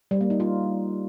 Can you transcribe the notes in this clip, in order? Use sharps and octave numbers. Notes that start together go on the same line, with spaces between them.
G3
A#3
D#4
F4